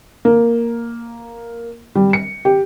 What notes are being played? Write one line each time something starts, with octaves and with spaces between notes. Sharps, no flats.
A#3
G3
C#7
G4